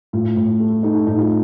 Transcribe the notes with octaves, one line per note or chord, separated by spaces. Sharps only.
A2 F4
A2
A3
A3 D#4
A2 D#4
F4